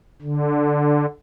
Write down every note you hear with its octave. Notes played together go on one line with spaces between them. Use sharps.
D3